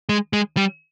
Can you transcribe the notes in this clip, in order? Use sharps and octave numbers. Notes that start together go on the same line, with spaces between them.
G#3
G#3
G3